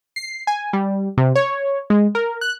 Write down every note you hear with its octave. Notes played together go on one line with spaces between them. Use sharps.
C7
G#5
G3
C3
C#5
G#3
A#4
F#6